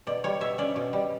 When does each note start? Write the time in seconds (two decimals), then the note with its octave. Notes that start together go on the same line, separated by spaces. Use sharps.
0.07 B2 D5
0.24 G3 C#5
0.41 B2 E5
0.58 C#4 D5
0.76 B2
0.93 G3